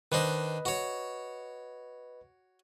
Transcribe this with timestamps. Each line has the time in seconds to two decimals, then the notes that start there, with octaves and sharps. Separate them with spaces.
0.12 D#3 D4 B4 C5 D#5
0.65 F#4 C#5